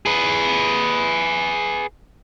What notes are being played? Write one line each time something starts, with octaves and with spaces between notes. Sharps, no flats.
G#4 B4